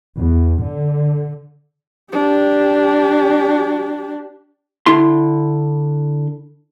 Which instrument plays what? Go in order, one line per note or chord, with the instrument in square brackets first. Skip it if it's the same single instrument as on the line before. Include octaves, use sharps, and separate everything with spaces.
[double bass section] E2
D3
[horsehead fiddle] D4 G4
[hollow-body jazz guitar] D3 E4 C6